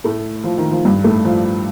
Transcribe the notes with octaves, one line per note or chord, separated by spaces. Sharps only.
A2 A3
F3
D#3
F3
G2 G3
A2 A3
F3